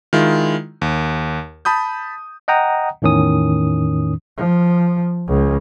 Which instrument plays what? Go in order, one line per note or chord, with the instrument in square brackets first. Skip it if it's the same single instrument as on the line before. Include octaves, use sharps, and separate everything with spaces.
[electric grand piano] D#3 G#3 E4 F4
D#2
A5 B5 D#6 G6
[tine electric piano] D#5 F#5 G5 A#5 D#6
E2 A2 D#3 C#4 D#6
[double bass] F3
C#2